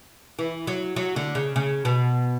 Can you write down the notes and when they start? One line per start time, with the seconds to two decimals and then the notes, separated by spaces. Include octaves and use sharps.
0.39 E3
0.67 F#3
0.96 F#3
1.16 D3
1.35 C#3
1.56 C#3
1.85 B2